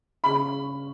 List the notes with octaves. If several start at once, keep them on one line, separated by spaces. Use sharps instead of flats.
C#3 B5